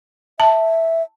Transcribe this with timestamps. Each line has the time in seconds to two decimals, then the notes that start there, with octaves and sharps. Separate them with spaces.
0.40 E5 A5